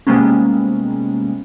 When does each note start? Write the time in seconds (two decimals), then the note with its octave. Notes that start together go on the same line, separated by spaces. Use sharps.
0.07 C3 G3 G#3 A#3 B3 C#4